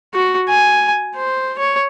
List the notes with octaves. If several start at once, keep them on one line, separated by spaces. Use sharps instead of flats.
F#4
G#5
C5
C#5